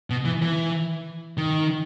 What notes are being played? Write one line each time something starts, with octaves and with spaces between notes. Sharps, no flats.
B2
E3
E3
D#3